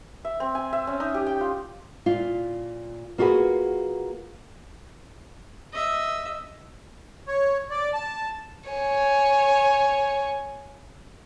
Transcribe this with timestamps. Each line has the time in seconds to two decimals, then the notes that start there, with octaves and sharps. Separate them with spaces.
0.25 E5
0.40 C4
0.55 G#5
0.73 E5
0.87 C#4
1.00 D#4
1.14 G4
1.26 G5
1.41 F4
2.06 A#2 F4
3.18 A#3 F4 F#4 G#4 B4
5.72 D#5 E5
7.27 C#5
7.70 D5
7.94 A5
8.70 C#5 G#5